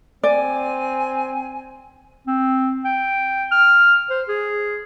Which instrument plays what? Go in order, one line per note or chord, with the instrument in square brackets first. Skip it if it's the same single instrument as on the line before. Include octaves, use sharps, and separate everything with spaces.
[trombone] C4 [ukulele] D5 [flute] G#5
[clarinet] C4
G5
F6
C5
G#4